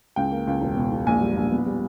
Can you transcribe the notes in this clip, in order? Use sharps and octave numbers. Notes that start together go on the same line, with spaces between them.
C#2 G5
A#3
C#2
E1
B2
E1
A#1 G#5
G3
A#1
B3
G3